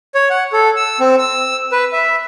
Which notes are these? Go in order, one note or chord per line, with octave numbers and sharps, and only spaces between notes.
C#5
F#5
A4
E6
C4
E6
B4
E5